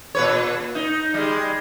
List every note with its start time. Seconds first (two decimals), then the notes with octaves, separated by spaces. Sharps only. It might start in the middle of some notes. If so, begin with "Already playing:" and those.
0.15 A#2 B4 C#5
0.75 D#4
1.14 G3 G#3